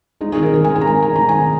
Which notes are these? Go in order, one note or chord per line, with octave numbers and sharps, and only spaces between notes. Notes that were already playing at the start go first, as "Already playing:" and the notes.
G#3 D#4
G#4
D#3
A#4
D#3 A#4
G#5
G#3
G#5
A#5
G#3 G#5
D#3 G#5
D#3 A#5
G#5
G#3